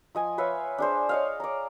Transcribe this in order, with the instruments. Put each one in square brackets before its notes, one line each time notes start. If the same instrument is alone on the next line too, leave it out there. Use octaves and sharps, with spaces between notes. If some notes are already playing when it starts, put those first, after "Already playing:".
[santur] F3 D#5 G#5
B4 C#5 E5 F5
D4 G#4 C5
C#5 D#5 F5
D5 A#5